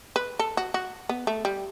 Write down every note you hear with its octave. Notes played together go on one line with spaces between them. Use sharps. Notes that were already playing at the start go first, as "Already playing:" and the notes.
B4
A4
F#4
F#4
B3
A3
G3